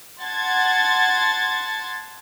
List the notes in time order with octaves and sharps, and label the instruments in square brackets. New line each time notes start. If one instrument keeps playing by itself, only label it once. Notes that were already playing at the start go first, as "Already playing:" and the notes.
[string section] F#5 A5 C6 G#6 A6